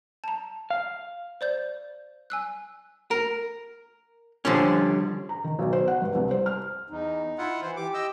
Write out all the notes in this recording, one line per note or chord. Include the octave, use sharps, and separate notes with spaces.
A5 A#5
F5
C5 D5 G6
G#5 E6 F#6
A#4
D3 F3 G3 C#4
A#5
D#3
B1
C5
F#5
G2
C2
C5
F6
E2 D#4
E4 F4 F#5
E3 C5
G4 D6
D#5 G5 E6